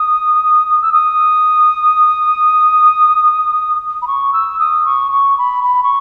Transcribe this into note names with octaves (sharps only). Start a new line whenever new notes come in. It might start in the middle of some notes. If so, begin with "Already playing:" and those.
Already playing: D#6
E6
D#6
B5
C#6
E6
D#6
C#6
C#6
B5
B5
C#6